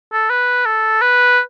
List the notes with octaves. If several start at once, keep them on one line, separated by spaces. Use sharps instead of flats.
A4
B4
A4
B4